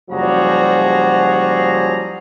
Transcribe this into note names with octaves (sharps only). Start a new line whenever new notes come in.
F#1 F3 G3 F#4 G#4 A#5